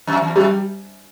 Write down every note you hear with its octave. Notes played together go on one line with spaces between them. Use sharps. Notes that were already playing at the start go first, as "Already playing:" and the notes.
F2
E2
F2 G3